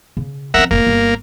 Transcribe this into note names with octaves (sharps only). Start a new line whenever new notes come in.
C#3
F3 C4 A#4 E5 F#5
F1 A2 A#3
G1